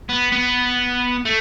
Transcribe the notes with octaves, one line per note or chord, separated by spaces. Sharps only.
B3
B3
A3